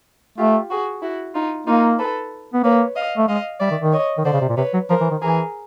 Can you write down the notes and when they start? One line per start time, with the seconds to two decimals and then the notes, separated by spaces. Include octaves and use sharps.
0.38 A3 F4 G4
0.71 F#4 G#4
1.03 E4 F#4
1.35 D#4 F4
1.67 A#3 D#4 F4
1.99 A4 B4
2.54 B3
2.64 A#3 B4 C#5
2.96 D#5 F5
3.18 A3
3.28 G#3 D#5 F5
3.60 G3 D5 E5
3.71 D#3
3.82 D#3
3.93 C#5 D#5
4.18 D#3
4.25 D3 C5 D5
4.33 C#3
4.41 C3
4.49 A#2
4.57 C3 B4 C#5
4.74 F#3
4.90 F3 A#4 C5
5.01 E3
5.11 D#3
5.22 E3 G#4 A#4